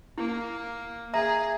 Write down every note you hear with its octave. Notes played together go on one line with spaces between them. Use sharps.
A#3 E4
G#4 E5 A#5